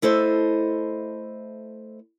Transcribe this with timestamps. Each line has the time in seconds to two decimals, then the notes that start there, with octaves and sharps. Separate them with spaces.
0.02 A3 E4 A4 C5 D#5